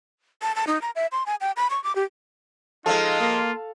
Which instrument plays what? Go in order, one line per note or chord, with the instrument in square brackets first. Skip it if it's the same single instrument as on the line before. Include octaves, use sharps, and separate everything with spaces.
[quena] A5
A5
D#4
A#5
E5
C6
G#5
G5
B5
C#6
D6
G4
[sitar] F3 G#3 [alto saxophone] D#4 [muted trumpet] F4 [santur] A4 F5
[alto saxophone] A#3